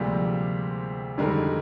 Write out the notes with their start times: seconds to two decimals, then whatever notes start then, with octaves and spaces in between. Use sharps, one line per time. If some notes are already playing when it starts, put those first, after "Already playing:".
Already playing: D2 C3 F3 G3 G#3 A#3
1.18 F2 D3 D#3 G3 G#3 D#4 A#4